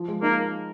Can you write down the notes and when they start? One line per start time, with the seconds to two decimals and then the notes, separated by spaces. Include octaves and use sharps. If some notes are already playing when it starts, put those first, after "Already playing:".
Already playing: F3
0.08 G#3
0.22 A#3 D#4